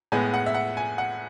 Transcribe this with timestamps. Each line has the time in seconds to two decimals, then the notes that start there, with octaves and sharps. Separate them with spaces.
0.12 A2 G#3 B3 G#5
0.34 F#5
0.46 E5
0.55 F#5
0.77 G#5
0.98 F#5